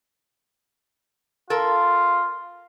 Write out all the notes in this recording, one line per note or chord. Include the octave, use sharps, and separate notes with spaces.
F4 A4 A#4